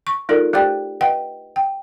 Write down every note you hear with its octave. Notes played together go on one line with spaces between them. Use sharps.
C#6
A3 D#4 F4 A4 A#4 D5
A3 G4 C5 D5 G5
B4 D#5 F#5 G5
G5